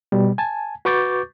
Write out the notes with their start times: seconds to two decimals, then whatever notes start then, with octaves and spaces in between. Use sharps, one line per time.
0.12 B2 G3
0.38 G#5 A5
0.85 F#4 B4 C#6 D6 G6 A6